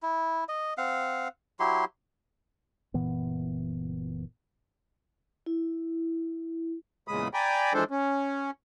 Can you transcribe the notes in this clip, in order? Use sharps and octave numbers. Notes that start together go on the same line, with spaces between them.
E4
D#5
C4 F5 F#5
F#3 E4 G4 C6
F#1 A#2 E3 B3
E4
E2 A#2 C#3 G#3 B5 D#6
D5 G5 G#5 A#5 B5
E3 F3 G#3 D4 A4 C5
C#4